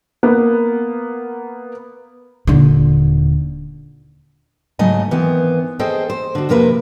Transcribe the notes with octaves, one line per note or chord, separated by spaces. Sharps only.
A#3 B3
D#1 D3
G#2 C#3 F#3 A3 D#5 G#5
D#3 E3 B3 C4
G#4 A4 C5 D#5 G5
C5
D3 F#4
F2 C3 A#3 A#4 B4 E5